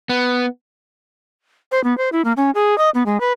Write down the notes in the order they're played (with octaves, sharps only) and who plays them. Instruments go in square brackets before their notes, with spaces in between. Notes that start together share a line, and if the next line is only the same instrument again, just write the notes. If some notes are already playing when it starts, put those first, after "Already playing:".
[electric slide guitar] B3
[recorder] C5
B3
C5
E4
A#3
C#4
G#4
D#5
B3
G#3
B4